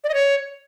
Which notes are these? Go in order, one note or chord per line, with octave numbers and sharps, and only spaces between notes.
D5
D#5
C#5